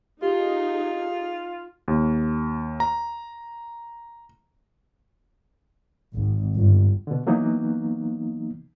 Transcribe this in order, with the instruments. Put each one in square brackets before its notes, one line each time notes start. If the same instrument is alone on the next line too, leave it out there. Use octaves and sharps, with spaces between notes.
[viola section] D#4 G#4 [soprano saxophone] F4 [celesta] G4
[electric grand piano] D#2
A#5
[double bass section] G#1
G1
[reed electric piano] B2 D3
E3 F#3 A#3 B3 D#4